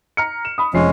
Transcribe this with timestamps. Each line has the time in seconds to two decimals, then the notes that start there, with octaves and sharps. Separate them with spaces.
0.17 A#5 F6 C#7
0.45 E7
0.58 B5 D#6
0.74 F1 F2 G#3 C#4 C7